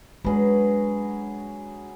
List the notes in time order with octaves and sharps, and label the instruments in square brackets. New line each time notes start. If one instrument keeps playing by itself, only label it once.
[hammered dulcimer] F#3 G#4 B4 [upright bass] G#3 D4